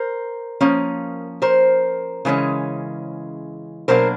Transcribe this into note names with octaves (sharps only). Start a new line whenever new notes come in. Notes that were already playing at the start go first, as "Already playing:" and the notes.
Already playing: A#4 C5
F3 A#3 C#4
A#4 C5
C#3 E3 G#3 C#4
B2 F#3 A#3 D4 A#4 C5